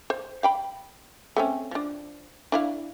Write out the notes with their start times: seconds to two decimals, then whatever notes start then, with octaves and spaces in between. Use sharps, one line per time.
0.10 C5
0.43 F5 G5 B5
1.36 A3 C4 C#4
1.71 F3 D4
2.52 D4 E4 F5